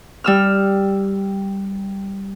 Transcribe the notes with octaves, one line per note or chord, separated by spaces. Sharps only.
G3 E6 F6